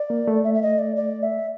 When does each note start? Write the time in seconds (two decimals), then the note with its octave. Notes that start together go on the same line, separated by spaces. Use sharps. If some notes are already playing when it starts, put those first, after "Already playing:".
Already playing: D5
0.10 A#3
0.27 A3
0.44 E5
0.54 E5
0.62 D#5
0.79 D5
0.96 D5
1.23 E5